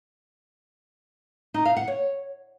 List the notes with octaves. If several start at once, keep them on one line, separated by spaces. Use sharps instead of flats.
D#4
F5
F#5
C#5